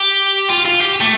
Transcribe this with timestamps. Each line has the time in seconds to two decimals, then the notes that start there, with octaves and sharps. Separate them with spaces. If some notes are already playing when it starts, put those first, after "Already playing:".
Already playing: G4
0.50 F4
0.65 F4
0.81 G4
1.01 A3